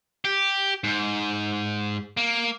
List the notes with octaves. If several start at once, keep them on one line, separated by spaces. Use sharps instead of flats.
G4
G#2
A#3